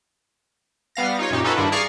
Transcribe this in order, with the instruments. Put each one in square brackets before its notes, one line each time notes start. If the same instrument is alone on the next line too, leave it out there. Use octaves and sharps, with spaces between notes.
[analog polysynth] G3 B3 F5 A#6
D#4 F4 C#5
F#2 A#2 D#4 G4
C#4 D#4 F4 F#4 A4 B4
G2 D#3 D4 E4
G#4 D5 F5 A#5 C#6 F6